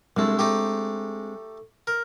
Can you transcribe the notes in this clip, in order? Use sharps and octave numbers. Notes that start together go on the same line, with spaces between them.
C2 G#3 A3 C4 D4
A3 D#4 G4
A#4